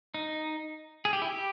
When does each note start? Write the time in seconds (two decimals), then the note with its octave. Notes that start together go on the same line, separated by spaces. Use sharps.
0.14 D#4
1.05 G#4
1.13 G4
1.22 E4
1.30 G4